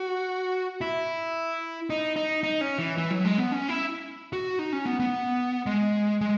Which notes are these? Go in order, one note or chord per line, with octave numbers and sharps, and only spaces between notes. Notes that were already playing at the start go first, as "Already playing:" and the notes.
Already playing: F#4
E4
D#4
D#4
D#4
C#4
E3
E3
F#3
G#3
B3
C#4
E4
F#4
D#4
C#4
B3
B3
G#3
G#3